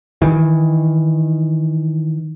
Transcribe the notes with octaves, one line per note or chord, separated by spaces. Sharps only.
D#3 E3